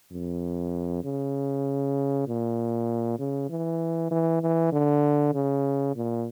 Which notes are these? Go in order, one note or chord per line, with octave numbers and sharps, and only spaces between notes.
F2
C#3
A#2
C#3
E3
E3
E3
D3
C#3
A#2